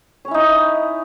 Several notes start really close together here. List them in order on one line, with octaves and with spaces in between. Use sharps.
C#5 C#4 E4 D#4